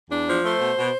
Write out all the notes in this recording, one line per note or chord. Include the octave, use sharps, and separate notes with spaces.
E2 D4
F3
A3 C5
B2
B2